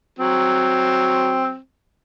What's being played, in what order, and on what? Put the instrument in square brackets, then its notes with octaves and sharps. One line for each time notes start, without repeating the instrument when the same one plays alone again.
[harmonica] F#3 C4